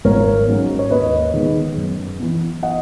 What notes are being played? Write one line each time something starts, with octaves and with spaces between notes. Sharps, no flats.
G#1 A#4 C#5
G#2 F#3 C#4
C#5
D#2 B4 D#5
D#3 G#3 B3
F#2
E3 B3
D#5 F#5